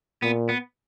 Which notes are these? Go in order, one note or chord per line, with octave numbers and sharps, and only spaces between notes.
A#2 B3
B3